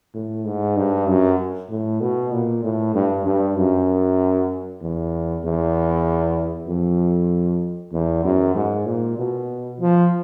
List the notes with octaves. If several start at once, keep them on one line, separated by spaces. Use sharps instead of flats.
A2
G#2
G2
F#2
A2
B2
A#2
A2
G2
G2
F#2
E2
E2
F2
E2
F#2
G#2
A#2
B2
F3